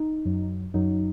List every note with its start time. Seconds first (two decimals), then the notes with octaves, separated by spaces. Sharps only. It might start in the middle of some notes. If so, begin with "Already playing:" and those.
Already playing: D#4
0.25 F#2 F#3
0.74 F#2 F#3 D#4